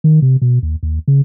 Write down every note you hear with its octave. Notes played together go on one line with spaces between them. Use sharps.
D#3
C3
B2
D#2
D#2
C#3